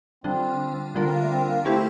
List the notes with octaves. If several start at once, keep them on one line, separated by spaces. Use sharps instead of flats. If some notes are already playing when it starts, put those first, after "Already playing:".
D3 G3 C4 D4 F4
D3 G3 A#3 D4 F4 A#4
C4
A#3
A3
C4
A#3
A3 C4 E4 G4 C5